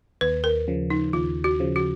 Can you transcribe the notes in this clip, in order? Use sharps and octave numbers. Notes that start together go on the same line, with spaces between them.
D#2 B4
A#4
C#3 F3
D#4
D#2 F4
F#4
C#3 F3
F#4